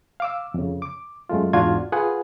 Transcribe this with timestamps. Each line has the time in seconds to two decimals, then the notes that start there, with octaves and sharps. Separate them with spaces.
0.20 F5 D6 E6
0.54 F2 C#3
0.82 D6
1.29 F#2 G#3 A3 F4
1.53 E2 G#2 D4 F4 F#4 G#6
1.92 F4 G#4 B4 F#5 G#5